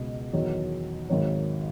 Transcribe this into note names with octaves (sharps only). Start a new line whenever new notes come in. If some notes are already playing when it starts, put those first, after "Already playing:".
Already playing: C#2 B2 G#3 D#5
E2 D#3 F#3 C#5
G#1 G#2 D#3 F#3 C#5